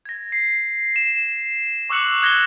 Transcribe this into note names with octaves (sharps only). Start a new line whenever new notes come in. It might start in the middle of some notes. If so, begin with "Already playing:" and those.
G#6 A#6
C7
E7
C#6 D6 E6 F#6 C#7 F#7
D#6 F#6 G#6 A#6 F#7 G7